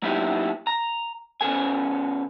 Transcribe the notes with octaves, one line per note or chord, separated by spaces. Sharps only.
F#3 A#3 B3 D#4 E4 G4
A#5
C#3 B3 A4 G#5